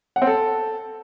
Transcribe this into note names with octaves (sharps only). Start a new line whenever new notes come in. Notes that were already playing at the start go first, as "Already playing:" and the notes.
F#5
C4
A4